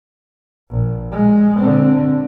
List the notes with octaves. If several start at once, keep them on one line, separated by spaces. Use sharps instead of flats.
A#1
G#3
D3 C4